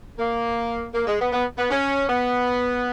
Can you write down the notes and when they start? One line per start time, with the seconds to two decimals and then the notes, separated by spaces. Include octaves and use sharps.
0.19 A#3
0.94 A#3
1.07 G#3
1.20 B3
1.32 B3
1.58 B3
1.71 C#4
2.08 B3